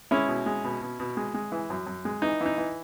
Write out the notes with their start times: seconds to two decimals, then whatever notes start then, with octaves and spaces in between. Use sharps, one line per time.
0.11 G#3 C#4 E4
0.28 B2
0.46 G#3
0.64 B2
0.82 B2
1.00 B2
1.17 G#3
1.34 G#3
1.52 E3
1.70 F#2
1.87 F#2
2.05 G#3
2.22 E3 D#4
2.41 E3 D#4
2.58 E3